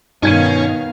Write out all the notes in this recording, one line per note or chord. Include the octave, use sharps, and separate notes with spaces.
G2 B2 D#3 C#4 D#4 F5 G#6 D#7